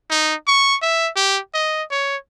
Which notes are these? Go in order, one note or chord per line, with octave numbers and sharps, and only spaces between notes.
D#4
C#6
E5
G4
D#5
C#5